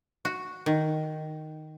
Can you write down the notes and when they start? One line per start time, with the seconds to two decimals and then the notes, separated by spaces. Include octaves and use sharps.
0.25 F#4
0.66 D#3